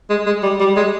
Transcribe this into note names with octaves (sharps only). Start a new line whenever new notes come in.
G#3
G#3
G3
G3
G#3